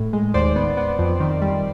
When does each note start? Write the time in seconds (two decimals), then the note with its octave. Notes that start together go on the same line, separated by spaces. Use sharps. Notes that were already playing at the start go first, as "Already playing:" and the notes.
Already playing: A2
0.13 G#3
0.34 D#2 C5 D5
0.56 B3
0.77 B3
0.99 F2
1.20 D#3
1.42 G3